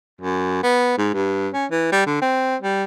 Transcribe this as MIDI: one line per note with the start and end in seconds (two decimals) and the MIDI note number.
0.21 0.60 42
0.63 0.97 59
0.98 1.10 44
1.14 1.48 43
1.53 1.66 61
1.71 1.90 52
1.92 2.04 55
2.06 2.20 50
2.22 2.56 60
2.62 2.84 55